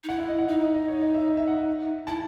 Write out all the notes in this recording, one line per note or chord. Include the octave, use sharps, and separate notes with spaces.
D#4
E4 F#5
E5
D#5
F#5
D#4 E5
D#5
D#5
C#5
D#5
E5
D#5
E5
F#5
E4 A5